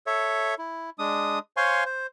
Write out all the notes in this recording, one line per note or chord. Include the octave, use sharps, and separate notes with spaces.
A4 C#5 E5
E4
G#3 D4 D#6
C5 C#5 F5 G#5 C6 C#6
C5